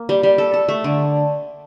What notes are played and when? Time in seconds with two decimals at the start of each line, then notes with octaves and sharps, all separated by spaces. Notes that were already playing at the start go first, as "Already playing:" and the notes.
Already playing: A#3
0.09 G3
0.23 G3
0.38 A4
0.53 A4
0.69 A3
0.84 D3